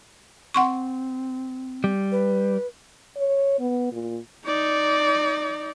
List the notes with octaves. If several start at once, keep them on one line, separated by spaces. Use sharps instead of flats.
C4 F#5 C6 C#6
G3
B4
C#5
B3
A#2
D#4 D5